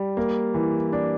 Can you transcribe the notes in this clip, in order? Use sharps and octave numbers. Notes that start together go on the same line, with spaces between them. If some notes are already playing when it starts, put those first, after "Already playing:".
Already playing: G3
A#3
E3
D4